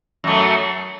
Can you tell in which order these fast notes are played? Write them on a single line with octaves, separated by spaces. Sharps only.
F#2 A3 F#3